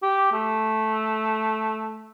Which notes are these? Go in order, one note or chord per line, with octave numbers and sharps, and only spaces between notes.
G4
A3